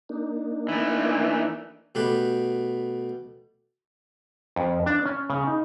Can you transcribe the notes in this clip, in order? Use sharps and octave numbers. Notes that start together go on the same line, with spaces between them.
A#3 D4 D#4
E3 A3
B2 A3 G4 B4
F2
D4
C#4
C#3
D#4